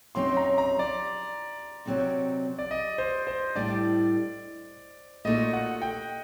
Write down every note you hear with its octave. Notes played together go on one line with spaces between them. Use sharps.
F#2 F#3 C4 D#4 C6
A#5
A#5
D5
C3 F#3 C4 D#4
D5
D#5
C5
C5
A2 G3 D4 D5
A#2 A3 D#4 F#4 D#5
F#5
G5